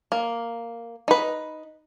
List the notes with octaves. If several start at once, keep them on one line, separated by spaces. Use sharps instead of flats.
A#3
D#4 B4